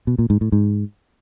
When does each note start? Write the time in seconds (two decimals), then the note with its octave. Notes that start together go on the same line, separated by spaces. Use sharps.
0.07 B2
0.19 A#2
0.30 G#2
0.41 A2
0.52 G#2